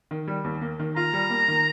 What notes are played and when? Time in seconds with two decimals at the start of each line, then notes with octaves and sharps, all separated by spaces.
0.11 D#3
0.28 G3
0.44 D#2
0.61 A#3
0.79 D#3
0.96 F4 A#5
1.13 G3
1.30 A#3
1.48 D#3